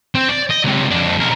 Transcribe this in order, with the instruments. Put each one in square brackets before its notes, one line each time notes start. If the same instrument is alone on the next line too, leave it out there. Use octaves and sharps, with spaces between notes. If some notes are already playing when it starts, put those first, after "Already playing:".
[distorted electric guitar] C4
D5
D#5
C#2 C3
F2 D4
B1 A#4